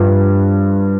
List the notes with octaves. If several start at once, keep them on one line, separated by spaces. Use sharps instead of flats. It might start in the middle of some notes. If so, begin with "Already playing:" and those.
Already playing: G2 F3